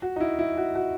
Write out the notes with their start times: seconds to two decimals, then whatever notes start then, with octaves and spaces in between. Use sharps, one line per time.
0.02 F#4
0.16 D#4
0.20 E4
0.39 E4
0.57 F#4
0.75 F#4